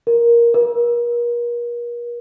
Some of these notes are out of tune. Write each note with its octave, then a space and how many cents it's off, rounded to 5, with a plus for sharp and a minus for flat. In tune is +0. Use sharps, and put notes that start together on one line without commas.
A#4 +10
A#4 +40